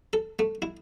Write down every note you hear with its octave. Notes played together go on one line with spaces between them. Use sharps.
A4
A3
E4